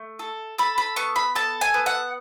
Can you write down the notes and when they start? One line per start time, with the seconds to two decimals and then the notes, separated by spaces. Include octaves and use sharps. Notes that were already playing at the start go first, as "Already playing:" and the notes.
Already playing: A3
0.19 A4
0.58 A4 B5
0.78 B5
0.96 B3 C#6
1.16 B5
1.35 A4 A5
1.61 G#5
1.74 B3
1.86 F#5